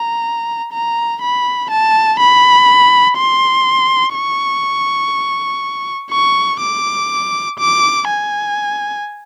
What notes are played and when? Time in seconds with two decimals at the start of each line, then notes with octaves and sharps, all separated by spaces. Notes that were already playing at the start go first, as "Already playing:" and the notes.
Already playing: A#5
0.72 A#5
1.21 B5
1.70 A5
2.20 B5
3.17 C6
4.15 C#6
6.11 C#6
6.61 D6
7.59 D6
8.08 G#5